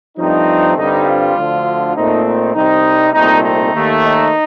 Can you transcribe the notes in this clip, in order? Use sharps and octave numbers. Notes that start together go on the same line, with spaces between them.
G2 F3 A3 C4 D#4
G2 D3 G3 C4 D#4
F3 F4
D2 D3 F3
A#2 A3 C4 D#4
D#4
C2 C3 G3 C4 D#4
C2 A#2 A3 C4 D#4
D#4
D#2 D#3 A3
D#4